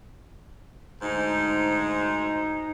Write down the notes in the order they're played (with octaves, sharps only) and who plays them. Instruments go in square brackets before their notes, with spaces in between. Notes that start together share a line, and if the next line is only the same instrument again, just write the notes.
[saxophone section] D2 G#2 C5 [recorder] D#4